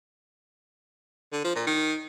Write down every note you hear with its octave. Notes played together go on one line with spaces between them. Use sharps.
D3
F3
A#2
D#3